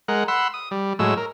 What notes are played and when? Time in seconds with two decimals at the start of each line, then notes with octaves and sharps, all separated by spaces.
0.08 G#3 A#4 F#5
0.28 F#5 B5 C6 E6
0.54 D#6
0.71 G3
0.99 A2 F#3 G#3 E6
1.17 A#4